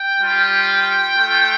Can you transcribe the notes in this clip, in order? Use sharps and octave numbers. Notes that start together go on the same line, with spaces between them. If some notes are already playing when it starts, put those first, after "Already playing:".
Already playing: G5
G3 F4
A3 F4